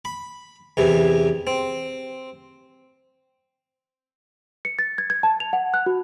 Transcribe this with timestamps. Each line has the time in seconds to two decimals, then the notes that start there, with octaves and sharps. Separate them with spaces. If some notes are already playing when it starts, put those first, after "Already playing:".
0.05 B5
0.77 E2 C3 E3
1.47 C4
4.65 C#7
4.79 A6
4.98 G#6
5.10 G#6
5.23 A5
5.40 F7
5.53 F#5
5.74 F#6
5.86 F#4